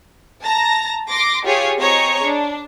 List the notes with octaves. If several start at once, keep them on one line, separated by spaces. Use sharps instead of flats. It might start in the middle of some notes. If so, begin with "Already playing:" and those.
A5 A#5 A#6
C6 D6 A#6
F4 G4 G#4 C#5
C4 G#4 C#5 D#5 A#5 C#6
D4